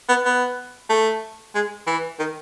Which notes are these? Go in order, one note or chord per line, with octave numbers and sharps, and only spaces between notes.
B3
B3
A3
G#3
E3
D#3